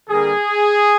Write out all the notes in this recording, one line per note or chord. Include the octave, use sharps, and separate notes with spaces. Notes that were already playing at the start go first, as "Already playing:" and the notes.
D3 G3 A#3 G#4